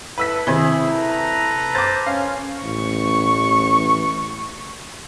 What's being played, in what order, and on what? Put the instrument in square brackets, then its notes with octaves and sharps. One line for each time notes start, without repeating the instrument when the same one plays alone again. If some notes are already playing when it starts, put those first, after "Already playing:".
[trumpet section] E4 A4 [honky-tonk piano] B4 E6 B6
[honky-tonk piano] C3 [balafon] D#3 C4 B5 [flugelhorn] E4 [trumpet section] G#4
[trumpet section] A4 B4 A#5
[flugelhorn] C5 [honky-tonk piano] D6 A6
[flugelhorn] C#4 [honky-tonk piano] F5
[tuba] A1 [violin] C#6